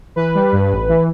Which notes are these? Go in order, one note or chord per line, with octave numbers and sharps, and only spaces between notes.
E3 B4
G3
G2
A1
E3